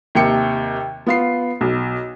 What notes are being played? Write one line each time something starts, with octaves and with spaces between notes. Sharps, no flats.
D#2 C3 G5 C#7
B3 F4 C7
B1